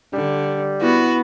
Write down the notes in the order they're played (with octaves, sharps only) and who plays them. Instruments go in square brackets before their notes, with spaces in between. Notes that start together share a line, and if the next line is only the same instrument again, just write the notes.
[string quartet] D3 [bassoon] G3
[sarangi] B3 [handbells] E4 [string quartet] F#4